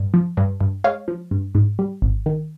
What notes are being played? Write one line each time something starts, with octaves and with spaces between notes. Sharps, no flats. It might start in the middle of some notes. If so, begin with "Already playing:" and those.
Already playing: G2
F3
G2
G2
G#3 C#5 F5
F3
G2
G#2
G3
G#1
D#3